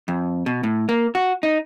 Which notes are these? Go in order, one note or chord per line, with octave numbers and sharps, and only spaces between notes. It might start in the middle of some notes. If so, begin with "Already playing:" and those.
F2
B2
A2
A#3
F#4
D#4